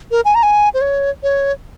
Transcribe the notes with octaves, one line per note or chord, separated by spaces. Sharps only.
A#4
G#5
A#5
G#5
C5
C#5
C#5